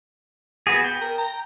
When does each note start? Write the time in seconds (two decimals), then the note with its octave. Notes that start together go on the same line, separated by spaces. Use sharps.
0.67 B3 F#4 G#4
0.84 G5
1.01 A#4
1.18 A#5